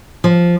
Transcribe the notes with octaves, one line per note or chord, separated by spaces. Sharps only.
F3